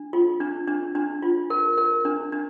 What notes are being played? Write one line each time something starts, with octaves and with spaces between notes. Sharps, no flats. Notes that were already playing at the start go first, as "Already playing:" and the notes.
Already playing: D4
F4
D4
D4
D4
F4
A#4
A#4
D4
D4